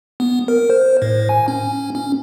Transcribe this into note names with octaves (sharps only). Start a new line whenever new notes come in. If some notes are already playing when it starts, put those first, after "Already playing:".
B3
A#4
C5
A2
G#5
C#4
C#4